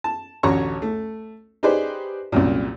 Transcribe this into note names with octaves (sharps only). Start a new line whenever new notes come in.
A5
A1 D2 C#5 A#5 C#6
A3
D#4 G4 G#4 B4 C5 D5
C2 F#2 A#2